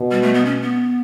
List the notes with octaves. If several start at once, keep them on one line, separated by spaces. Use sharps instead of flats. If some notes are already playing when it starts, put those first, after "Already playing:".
Already playing: B2
G3
A3
B3
C#4
B3